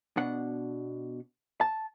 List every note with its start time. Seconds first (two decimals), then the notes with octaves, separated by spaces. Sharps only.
0.17 B2 D4 F#5
1.61 A5